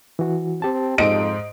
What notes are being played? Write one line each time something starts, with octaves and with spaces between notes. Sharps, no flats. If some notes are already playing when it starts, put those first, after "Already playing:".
E3 F#4
C4 G4 A5
F2 G#2 D#5 D7